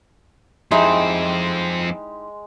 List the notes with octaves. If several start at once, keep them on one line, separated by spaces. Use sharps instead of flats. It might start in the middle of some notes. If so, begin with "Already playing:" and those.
F2 G#3 C4 D#4 E4 G4